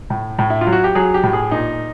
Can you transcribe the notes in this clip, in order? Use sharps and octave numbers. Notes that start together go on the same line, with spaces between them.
A2
A2
E4
F4
F#3
F#4
G4
F#3 G#4
G4
A2
G#4
A#2 D#4